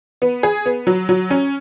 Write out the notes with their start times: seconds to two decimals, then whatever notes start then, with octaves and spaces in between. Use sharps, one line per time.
0.22 B3
0.43 G#4
0.66 B3
0.87 F#3
1.09 F#3
1.30 C#4